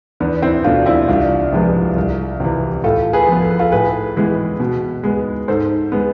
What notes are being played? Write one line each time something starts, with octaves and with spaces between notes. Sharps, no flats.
E2 B3 D4
C4 E4
B2 A3 D4 F4
C4 E4
C2 D4 F4
C3 F3 G#3 B3
C2
C3 E3
A2 F4 A4
G#4 B4
F3 B3
A4
B4
F4 A4
A2 G#4 B4
E3 G#3 B3
B2
G#3 B3
G#2 A4 C5
G#3 B3